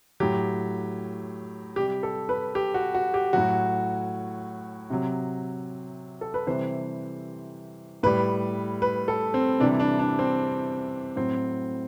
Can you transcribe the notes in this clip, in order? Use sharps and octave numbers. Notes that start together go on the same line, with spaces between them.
A2 F#3 G4
C3 G3 G4
A4
B4
G4
F#4
F#4
G4
A2 F#3 F#4
C3 F#3
A4
B4
C3 E3 G3 C5
A2 G3 B4
B4
A4
C4
C3 E3 G3 D4
D4
D4
C4
A2 F#3 C4